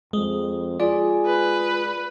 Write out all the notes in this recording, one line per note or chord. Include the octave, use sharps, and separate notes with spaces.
F2 G#3
F4 G#4 D5
B4